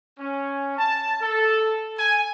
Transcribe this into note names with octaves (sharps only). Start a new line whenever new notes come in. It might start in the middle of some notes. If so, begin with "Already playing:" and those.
C#4
A5
A4
G#5